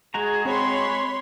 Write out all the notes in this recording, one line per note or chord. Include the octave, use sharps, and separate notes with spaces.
G#3 F#4 G#4 A#5
C4 C#5 B5 C6